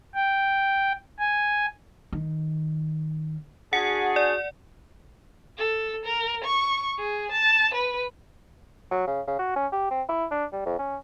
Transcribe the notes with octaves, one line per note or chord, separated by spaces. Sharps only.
G5
G#5
D#3
D4 F#4 G#4 F#5 C#7
D5
A4
A#4
C#6
G#4
A5
B4
F#3
C#3
C#3
F#4
C#4
G4
C4
E4
D4
G3
F2
C#4